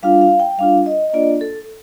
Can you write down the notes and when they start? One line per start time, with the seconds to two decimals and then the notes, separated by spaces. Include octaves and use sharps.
0.03 G3 D4 F4 F5
0.21 F5
0.40 G5
0.58 G3 D4 F4 F5
0.86 D#5
1.10 D#5
1.13 A#3 D4 F4 D5
1.41 A4